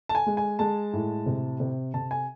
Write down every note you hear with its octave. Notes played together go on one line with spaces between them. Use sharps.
A5
G#5
G#3
G#5
G#3 A5
A2
C3
C3
C3 A5
G#5